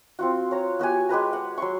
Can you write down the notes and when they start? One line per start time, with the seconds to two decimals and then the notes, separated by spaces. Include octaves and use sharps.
0.19 C4 F4 F#4
0.51 C#5 A#5
0.79 B3 F#4 G4 G#5
1.09 G#3 G4 B4 A#5
1.33 F#5
1.58 F#3 C6 C#6